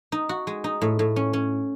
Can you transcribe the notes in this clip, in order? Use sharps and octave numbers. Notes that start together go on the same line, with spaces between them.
D#4
F#4
G#3
D#4
A2
A2
C#4
C#4